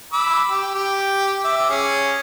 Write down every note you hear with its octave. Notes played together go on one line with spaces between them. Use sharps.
B5 D6 E6
G4
G4
E5 D6
C#4 G#4